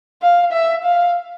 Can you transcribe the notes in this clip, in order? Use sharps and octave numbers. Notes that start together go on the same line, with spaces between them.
F5
E5
F5